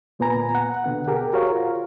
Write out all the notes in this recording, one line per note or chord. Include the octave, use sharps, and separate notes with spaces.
D2 A#2 B3 B4 G#5 A#5
F#5
B2 D3 B3 F#5
G4 G#4 A#4
F#4 A#4 C5 C#5 F5
F4